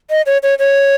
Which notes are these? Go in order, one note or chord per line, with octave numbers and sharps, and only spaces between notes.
D#5
C#5
C#5
C#5